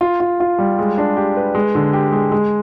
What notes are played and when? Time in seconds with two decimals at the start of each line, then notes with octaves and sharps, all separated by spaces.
0.01 F4
0.20 F4
0.40 F4
0.58 G3
0.79 G#3
0.98 D4
1.17 G4
1.37 B4
1.55 G#3
1.75 D3
1.93 G4
2.13 G#3
2.32 G#3